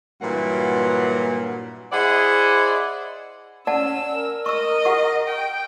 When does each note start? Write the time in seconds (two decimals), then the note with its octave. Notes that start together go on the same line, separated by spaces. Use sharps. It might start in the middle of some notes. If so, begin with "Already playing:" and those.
0.21 G2 A#2 E3 F#3 A#3 F#5
1.92 E4 G#4 C5 D5 D#5 F#5
3.67 C#4 D5 F#5 A5 E6
4.11 A#4
4.46 D#5 C#6 E6
4.85 G4 F#5 C#6
5.27 G5